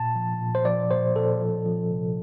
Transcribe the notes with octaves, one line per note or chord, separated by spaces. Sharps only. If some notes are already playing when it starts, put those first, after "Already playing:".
Already playing: A#2 A5
F3
A#2
C5
F3 D5
A#2 C5
A#2 A4
F3
F3
C3